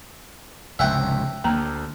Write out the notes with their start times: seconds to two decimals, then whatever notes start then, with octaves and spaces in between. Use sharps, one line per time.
0.79 F1 C#2 G#2 E5 F#5 G5
1.44 D2 A#3 A#5